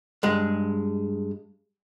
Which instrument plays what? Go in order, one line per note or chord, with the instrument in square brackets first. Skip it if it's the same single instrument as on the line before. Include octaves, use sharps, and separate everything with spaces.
[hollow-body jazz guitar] G2 G#3